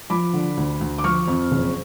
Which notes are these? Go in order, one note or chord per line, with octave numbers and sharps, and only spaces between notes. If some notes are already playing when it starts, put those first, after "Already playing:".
F3 B5 D6
D3
D2
D2
D6
F3 C#6 F6
F2
F#1